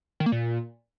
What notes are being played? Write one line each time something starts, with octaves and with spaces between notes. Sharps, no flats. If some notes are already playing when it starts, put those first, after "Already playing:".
D#3
A#3
A#2